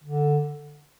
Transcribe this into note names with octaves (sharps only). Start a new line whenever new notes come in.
D3